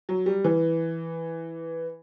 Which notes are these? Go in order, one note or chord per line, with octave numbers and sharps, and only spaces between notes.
F#3
G3
E3